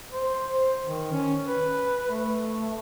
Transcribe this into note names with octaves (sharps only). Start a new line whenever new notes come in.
C5
C5
D#3
C#4
B4
A3